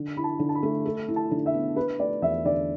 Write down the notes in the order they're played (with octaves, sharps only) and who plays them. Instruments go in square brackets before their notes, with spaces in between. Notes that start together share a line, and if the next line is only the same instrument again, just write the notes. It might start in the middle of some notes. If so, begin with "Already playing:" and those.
Already playing: [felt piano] D3
[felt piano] E4 [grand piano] B5
[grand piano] A5
[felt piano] D3
[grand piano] A5
B5
[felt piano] A3
A4
E4
[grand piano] A5
[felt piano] D3
[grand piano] E5
[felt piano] B3
[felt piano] D4 [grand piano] B4
[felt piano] A3 [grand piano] D5
[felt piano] E2 [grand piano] E5
[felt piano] D3 [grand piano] D5